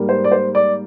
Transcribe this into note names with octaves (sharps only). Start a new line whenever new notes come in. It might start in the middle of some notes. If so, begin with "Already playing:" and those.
Already playing: G#2 G3 A#3
C5
D5
C5
D5